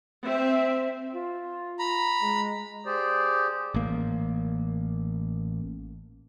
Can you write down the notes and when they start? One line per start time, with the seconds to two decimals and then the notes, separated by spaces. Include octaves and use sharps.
0.24 C4 E5
1.14 F4
1.79 A#5 B5
2.22 G#3
2.86 G4 G#4 C5 D5
3.74 A1 A#3